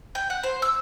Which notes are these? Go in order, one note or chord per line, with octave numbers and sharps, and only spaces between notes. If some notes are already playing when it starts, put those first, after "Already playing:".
G5
F#5
C5
E6